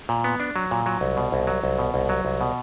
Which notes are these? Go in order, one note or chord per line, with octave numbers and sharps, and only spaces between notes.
A#2
B3
D4
F#3
A#2
F#3
C2
B2
C2
F#3
C2
B2
C2
F#3
C2
B2